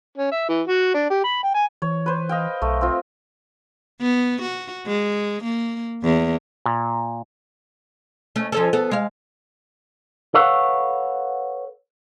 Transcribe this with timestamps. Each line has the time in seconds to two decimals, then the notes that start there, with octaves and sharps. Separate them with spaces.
0.18 C#4
0.32 E5
0.49 E3
0.68 F#4
0.94 D4
1.10 G4
1.24 B5
1.43 G5
1.55 G#5
1.82 E3 C#5
2.06 B4 C5
2.29 D#5 F5 G5
2.62 B1 A3
2.81 C4 F4
4.01 B3
4.42 F#4
4.86 G#3
5.44 A#3
6.04 E2
6.66 A#2
8.36 A3 C#4
8.52 F3 C#4 A4
8.73 B3 A4
8.91 G#3 F5
10.34 A4 B4 C#5 F5 F#5